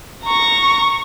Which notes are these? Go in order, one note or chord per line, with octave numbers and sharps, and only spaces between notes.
A#5 C#6